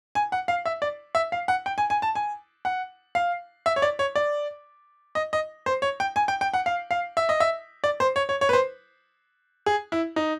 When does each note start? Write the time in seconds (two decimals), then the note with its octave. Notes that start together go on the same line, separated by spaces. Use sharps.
0.15 G#5
0.32 F#5
0.48 F5
0.65 E5
0.82 D5
1.15 E5
1.32 F5
1.48 F#5
1.66 G5
1.78 G#5
1.90 G#5
2.02 A5
2.15 G#5
2.65 F#5
3.15 F5
3.66 E5
3.76 C#5
3.82 D5
3.99 C#5
4.15 D5
5.15 D#5
5.33 D#5
5.66 C5
5.82 C#5
6.00 G5
6.16 G#5
6.28 G5
6.41 G5
6.54 F#5
6.66 F5
6.91 F5
7.17 E5
7.29 D#5
7.40 E5
7.84 D5
8.00 C5
8.16 C#5
8.29 C#5
8.41 C#5
8.49 B4
8.53 C5
9.66 G#4
9.92 E4
10.16 D#4